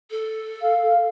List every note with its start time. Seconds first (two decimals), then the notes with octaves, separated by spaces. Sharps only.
0.11 A4
0.61 F5